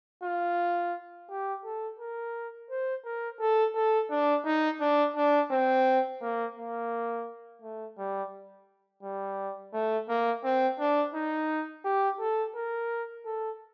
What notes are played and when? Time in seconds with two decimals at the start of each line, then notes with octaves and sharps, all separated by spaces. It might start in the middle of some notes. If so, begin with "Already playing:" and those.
0.23 F4
1.29 G4
1.64 A4
1.99 A#4
2.70 C5
3.05 A#4
3.40 A4
3.75 A4
4.10 D4
4.45 D#4
4.80 D4
5.16 D4
5.51 C4
6.21 A#3
6.57 A#3
7.62 A3
7.98 G3
9.03 G3
9.73 A3
10.09 A#3
10.44 C4
10.79 D4
11.14 D#4
11.84 G4
12.20 A4
12.55 A#4
13.25 A4